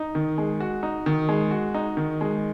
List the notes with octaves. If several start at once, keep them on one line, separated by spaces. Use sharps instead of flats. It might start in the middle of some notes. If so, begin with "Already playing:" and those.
Already playing: D#4
D#3
G#3
F#4
D#4
D#3
G#3
F#4
D#4
D#3
G#3